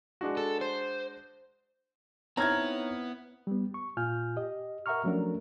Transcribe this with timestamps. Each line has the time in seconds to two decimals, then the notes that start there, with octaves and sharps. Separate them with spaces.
0.21 G#3 D4 F#4
0.37 A4
0.61 C5
2.37 B3 C4 D#4 E4 C#5 A#5 F6 G#6
3.47 G3 B3
3.74 C#6
3.97 A#2 F4 G#5 F6 G6
4.36 G4 D#5
4.86 A#4 E5 F#5 A#5 C#6 F6
5.04 F3 F#3 A3 C#4 D4 A#4